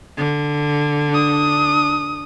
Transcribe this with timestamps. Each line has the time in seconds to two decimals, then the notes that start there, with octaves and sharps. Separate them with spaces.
0.17 D3
1.10 D4 D#6